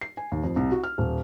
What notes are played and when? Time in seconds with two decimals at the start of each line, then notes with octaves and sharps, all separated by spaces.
0.01 C7
0.17 G#5
0.32 D#2
0.43 F2
0.56 C2
0.72 F#4
0.84 F6
0.98 D#1